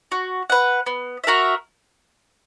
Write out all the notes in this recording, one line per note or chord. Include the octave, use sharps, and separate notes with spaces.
F#4
B4 F#5
B3
F#4 A#4 E5